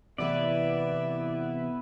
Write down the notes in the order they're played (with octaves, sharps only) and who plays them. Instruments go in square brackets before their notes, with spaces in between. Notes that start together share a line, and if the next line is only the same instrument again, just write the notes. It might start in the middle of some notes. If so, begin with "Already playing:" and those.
[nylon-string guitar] C3 E3 A3 [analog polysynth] B3 E4 B4 [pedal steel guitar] D5 [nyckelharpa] E5